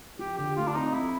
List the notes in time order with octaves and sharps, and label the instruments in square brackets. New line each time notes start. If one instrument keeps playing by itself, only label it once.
[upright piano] F3 [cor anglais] G4
[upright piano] D3 [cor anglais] G4
[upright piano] A3 [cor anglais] F4
[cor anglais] D4
[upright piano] C4 [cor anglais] D#4
[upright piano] F3 [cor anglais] E4